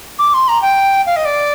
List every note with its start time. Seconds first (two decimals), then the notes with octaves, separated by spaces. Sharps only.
0.18 D6
0.33 C6
0.48 A#5
0.62 G5
1.06 F5
1.16 D#5
1.25 D5